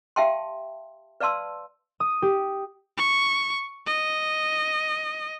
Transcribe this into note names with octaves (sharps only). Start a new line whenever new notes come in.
G4 E5 F5 G5 A5 C6
B4 D5 F5 A5 C6 E6
D#6
G4
C#6
D#5